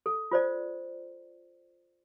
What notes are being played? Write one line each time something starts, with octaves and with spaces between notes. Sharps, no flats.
A4
F4 C5 D5